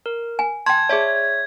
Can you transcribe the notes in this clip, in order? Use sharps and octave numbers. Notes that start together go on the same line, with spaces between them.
A#4
G#5
G5 A5 C6 G#6
G#4 C#5 D5 E5